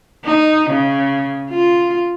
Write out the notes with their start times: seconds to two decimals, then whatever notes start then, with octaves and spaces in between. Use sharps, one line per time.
0.24 D#4
0.70 C#3
1.50 F4